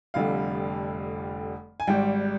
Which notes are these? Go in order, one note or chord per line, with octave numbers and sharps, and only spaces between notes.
F1 F2 D3 G3 F5
G#5
G#1 G#2 G3 G5